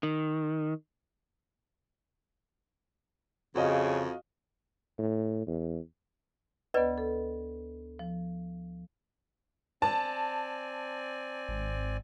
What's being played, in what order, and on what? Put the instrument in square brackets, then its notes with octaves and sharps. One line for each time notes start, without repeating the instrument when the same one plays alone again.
[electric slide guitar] D#3
[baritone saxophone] F2 [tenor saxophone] C#3 [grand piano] F#4 D#5 F5
[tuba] A2
E2
[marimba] D2 B3 [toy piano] B4 D5 D#5
[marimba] A4
F3
[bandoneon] C4 D5 G#5 [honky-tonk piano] A5
[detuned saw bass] G#1